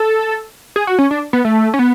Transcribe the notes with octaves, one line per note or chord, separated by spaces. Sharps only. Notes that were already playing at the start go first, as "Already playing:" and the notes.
Already playing: A4
G#4
F#4
C#4
D4
B3
A3
C#4
B3